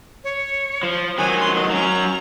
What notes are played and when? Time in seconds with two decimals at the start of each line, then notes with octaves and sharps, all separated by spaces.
0.24 C#5
0.83 F3
1.18 D#3 F#3 G#5
1.40 C6
1.56 D#5
1.70 F#3 C#4 A#5